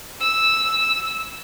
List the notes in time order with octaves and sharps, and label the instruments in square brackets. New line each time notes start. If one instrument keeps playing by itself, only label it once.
[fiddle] E6